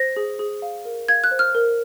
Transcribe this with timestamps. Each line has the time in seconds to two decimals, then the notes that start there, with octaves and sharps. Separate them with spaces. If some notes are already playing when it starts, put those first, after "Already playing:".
Already playing: C5 A#6
0.16 G#4
0.39 G#4
0.62 F5
0.85 A#4
1.09 F5 G#6
1.24 F#6
1.31 C5
1.39 F6
1.55 A#4